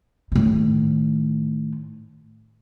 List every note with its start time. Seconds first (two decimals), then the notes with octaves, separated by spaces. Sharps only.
0.32 A2 D#3